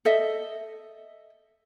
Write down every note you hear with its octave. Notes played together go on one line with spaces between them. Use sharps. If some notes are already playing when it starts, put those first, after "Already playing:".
A4 D#5 E5